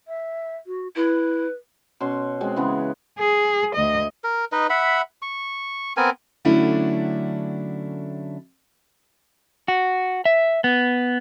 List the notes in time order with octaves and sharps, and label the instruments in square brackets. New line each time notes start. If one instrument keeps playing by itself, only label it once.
[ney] E5
F#4
[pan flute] E4 [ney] B4
[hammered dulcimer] B2 C#4 C6
G#3 C4 F#4
C#3 E3 B3 G#5
[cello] G#4
D2 D#5
[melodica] A#4
D#4 B4 D#5
E5 F#5 B5
C#6
B3 C4 A#4 G#5
[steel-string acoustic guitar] D3 F#3 A3 C#4 D4 E4
[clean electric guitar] F#4
E5
B3